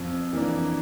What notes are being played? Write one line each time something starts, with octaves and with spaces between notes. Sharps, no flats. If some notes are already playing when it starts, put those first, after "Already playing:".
Already playing: F2
E3 A#3 D4